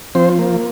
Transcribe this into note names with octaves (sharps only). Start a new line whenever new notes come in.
F3 C4 C5
A#3